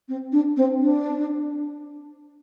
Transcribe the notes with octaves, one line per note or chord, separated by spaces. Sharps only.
C4
D4
C4
D4